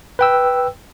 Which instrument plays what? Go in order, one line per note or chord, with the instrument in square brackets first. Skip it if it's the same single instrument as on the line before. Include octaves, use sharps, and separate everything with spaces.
[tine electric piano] B4 G5 E6